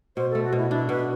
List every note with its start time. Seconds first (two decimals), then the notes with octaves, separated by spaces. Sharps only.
0.16 B2 C5
0.31 A4
0.35 A3
0.44 F#4
0.53 B2 E4
0.71 D4 E4
0.89 B2 B4